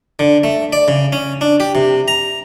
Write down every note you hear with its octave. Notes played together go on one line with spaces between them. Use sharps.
D3
A3
D5
C#3
C#4
D4
G4
C3
A#5